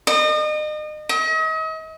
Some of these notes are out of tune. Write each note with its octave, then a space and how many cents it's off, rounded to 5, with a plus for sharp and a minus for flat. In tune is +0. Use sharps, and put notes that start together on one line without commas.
D#5 -35
D#5 +40